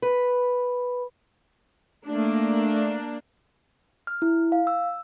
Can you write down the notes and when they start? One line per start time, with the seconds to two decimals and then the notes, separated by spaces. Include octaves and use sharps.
0.02 B4
2.07 A3 A#3 D4
4.07 F6
4.22 E4
4.52 F5
4.67 E6